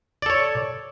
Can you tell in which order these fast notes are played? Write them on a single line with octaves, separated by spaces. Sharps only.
D5 A4 C#5